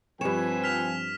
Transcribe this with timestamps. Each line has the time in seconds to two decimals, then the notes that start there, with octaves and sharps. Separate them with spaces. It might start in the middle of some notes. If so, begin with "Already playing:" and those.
0.21 G2 F3 C4 B4 C#5 G#5 E7
0.64 F6 B6 F7